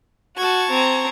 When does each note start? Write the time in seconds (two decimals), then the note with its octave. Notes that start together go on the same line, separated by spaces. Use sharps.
0.37 F#4 A5 C#6 G#6
0.69 C4 A#5